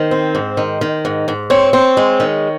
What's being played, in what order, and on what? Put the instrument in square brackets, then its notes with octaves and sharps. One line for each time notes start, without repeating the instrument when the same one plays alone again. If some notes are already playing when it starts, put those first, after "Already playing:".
Already playing: [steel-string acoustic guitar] D#3 [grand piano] C5
[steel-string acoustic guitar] C4
G#2
D#3
D#3
G#2
G#2
[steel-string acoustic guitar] C4 [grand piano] C#5
[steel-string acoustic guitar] C4
G#3
D#3